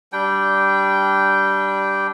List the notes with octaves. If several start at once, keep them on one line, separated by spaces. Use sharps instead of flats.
G3 D4 G5